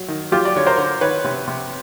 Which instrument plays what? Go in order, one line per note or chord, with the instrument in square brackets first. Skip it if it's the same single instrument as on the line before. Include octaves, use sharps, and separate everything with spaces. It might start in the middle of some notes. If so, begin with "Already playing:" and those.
Already playing: [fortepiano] F#3
D#3
F#3 F4 G4
D5
D3 C#5
A#4 C5
D3
D#3 B4 C#5
C3
C3